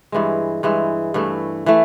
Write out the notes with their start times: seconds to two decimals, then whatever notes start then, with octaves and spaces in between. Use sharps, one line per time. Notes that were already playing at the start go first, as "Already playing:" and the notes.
0.12 G2 E3 G#3
0.63 G2 E3 G#3
1.14 G2 E3 A3
1.66 E3 A3